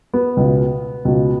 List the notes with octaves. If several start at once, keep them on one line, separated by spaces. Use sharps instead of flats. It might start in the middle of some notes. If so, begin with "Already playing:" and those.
B3
C#2 B2
C#2 B2